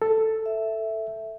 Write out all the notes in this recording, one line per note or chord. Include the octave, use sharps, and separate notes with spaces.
A4
E5